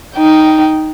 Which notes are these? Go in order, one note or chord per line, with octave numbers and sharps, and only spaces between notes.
D#4 G5